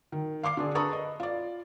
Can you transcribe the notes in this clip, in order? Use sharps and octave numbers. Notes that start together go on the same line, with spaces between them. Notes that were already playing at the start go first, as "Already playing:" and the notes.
D#3
F5 C6 D6 C7
D3 D4 G#4
A4 B4 A#5 B5 C#6 D#6
D#5
F4 D5